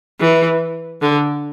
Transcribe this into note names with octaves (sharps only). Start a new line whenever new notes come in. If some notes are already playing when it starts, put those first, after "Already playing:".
E3
D3